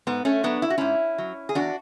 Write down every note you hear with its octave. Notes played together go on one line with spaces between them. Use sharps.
G#2 B3
A3 C#4
F#3 B3 D4
E4
F#4
G#2 C#4 E4
F#3
G#4
E2 D4 F#4